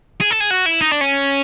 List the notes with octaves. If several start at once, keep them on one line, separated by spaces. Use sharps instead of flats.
G#4
A4
G#4
F#4
E4
D#4
D4
C#4